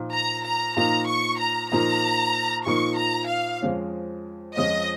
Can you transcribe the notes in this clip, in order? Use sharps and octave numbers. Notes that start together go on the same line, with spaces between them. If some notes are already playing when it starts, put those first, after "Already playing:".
Already playing: A#2 F3 A#3 D#4
A#5
A#5
A#2 F3 A#3 D#4 A#5
C#6
A#5
A#2 F3 A#3 D#4 A#5
A#2 F3 A#3 D#4 C#6
A#5
F5
F2 F3 G#3 C#4 F4
F2 F3 G#3 C#4 F4 D#5